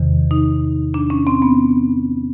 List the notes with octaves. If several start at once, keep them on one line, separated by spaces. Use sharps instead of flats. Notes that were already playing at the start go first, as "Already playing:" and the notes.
Already playing: E2 C3 D#3
D#4
D4
C#4
C4
B3